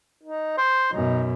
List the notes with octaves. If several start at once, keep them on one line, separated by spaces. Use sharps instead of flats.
D#4
C5
F#2 B2 D#4